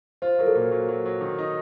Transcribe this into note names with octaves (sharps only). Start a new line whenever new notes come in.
F4 C5
F#3 A#4
A4
A#2
F#3
F#3
F#3
D#3
D#4